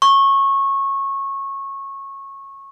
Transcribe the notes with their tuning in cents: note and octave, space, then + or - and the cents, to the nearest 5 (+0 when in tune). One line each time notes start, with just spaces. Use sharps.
C#6 -20